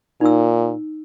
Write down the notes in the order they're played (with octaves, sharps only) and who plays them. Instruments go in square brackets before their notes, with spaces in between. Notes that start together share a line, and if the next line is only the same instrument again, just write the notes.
[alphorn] A#2 [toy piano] D#4 E6